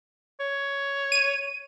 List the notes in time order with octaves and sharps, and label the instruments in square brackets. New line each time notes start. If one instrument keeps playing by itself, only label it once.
[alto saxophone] C#5
[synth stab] D#7